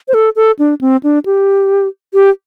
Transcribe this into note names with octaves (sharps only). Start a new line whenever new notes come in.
C5
A4
A4
D4
C4
D4
G4
G4